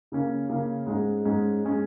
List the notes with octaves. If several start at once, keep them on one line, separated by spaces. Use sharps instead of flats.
C#3 A#3 C#4
C#3 A#3 C#4
G#2 G#3 C#4
G#2 G#3 C#4
G#3 C#4